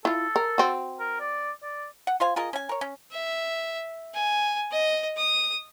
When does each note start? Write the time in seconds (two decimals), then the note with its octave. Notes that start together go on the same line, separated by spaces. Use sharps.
0.05 E4 F4 A4
0.36 A#4
0.58 C4 F#4
1.00 A#4
1.20 D5
1.62 D5
2.07 F#5
2.20 F4 C5 F5 G#5
2.36 F4 G#4 A#4 D#5
2.53 C#4 G#5
2.69 A#4 C#5
2.81 C#4
3.12 E5
4.14 G#5
4.71 D#5
5.17 D#6